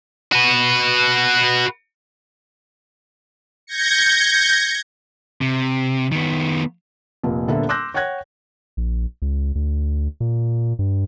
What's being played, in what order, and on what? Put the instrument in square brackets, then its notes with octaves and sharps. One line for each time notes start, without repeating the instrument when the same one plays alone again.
[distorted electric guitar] F#4 B4
[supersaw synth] G6 G#6 A#6 C#7
[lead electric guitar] C3
D#3 B3
[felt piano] F1 A#2
D#1 D3 A#3 B3 A4 E5
C6 D6 E6 F#6 G6 A#6
C#5 F#5 G5 F#6 G#6 A#6
[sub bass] A#1
C#2
D2
A#2
G2